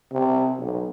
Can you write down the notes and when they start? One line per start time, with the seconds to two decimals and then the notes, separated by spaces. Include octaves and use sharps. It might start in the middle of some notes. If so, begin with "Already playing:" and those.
0.12 C3
0.59 B1